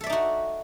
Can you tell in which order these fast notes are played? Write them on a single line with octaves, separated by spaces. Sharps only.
A4 E5 D5 D#4 F#4